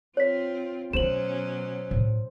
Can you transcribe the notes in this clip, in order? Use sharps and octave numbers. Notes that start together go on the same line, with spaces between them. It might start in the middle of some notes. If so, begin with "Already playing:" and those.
C4 F4 C#5 B6
B2 F#3 A3 B3 C#4 C5 E7 F#7
A2